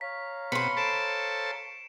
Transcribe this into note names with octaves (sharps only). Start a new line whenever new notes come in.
C#5 F5 A#5 B6
B2 C4 B4 B5 C6 C#7
A4 C5 A5 C7 D7 E7